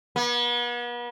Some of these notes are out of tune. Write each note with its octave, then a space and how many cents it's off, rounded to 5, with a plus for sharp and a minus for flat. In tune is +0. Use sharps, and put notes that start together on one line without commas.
B3 -40